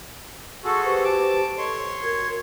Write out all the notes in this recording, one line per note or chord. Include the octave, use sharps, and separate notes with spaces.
F#4 G#4 A4 C6 C#6 E6
G4 B4 C5
A5 D6
A4 C#5 D#5 C6
F#4 A#4 G#6